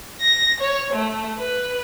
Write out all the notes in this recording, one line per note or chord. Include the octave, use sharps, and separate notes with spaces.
A#6
C#5
A3
B4